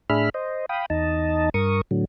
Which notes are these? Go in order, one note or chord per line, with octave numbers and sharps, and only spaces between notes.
A2 D4 G#4 E5 B5 F6
C5 D#5
F5 G5 B5 D#6
E2 D#4 D#5 A5
G2 A#4 C#6 D#6
A2 D3 F#3